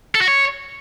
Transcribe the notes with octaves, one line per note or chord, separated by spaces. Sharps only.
A4
F#4
C#5